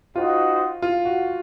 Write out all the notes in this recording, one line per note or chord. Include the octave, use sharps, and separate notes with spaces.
D#4 F4 F#4 C5 D#5 F#5
F4
F#4